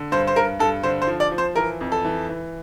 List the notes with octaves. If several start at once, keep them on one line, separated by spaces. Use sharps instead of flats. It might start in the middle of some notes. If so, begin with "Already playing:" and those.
Already playing: D3
G2 C5
C5
G2 A#4
G2 A4
D3 C5
C5
F3
D5
F3
C5
E3 A#4
F2
A4
E3
E3